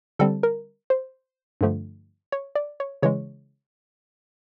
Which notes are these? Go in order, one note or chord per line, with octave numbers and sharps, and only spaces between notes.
D3 G3 C4 A4
A#4
C5
G2 D3 F3 A3
C#5
D5
C#5
C#3 E3 G#3 C#5